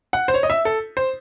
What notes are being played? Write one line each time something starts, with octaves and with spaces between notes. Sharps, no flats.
F#5
C5
C#5
D#5
E5
A4
C5